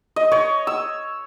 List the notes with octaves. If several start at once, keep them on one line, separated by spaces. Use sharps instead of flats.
D#5
C#5
E6